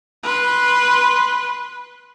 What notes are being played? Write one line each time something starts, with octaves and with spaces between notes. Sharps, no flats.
B4 C6